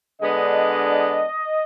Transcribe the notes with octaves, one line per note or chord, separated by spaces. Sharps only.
D3 G#3 B3 D4 D#5